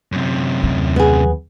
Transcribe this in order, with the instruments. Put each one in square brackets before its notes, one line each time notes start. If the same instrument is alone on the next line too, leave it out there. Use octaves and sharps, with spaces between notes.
[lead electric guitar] F#2 C3
[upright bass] D#2
[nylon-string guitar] B3 G#4